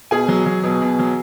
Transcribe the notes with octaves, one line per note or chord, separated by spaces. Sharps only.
B2 G#4 G#5
F#3
F#3
B2
B2
F#3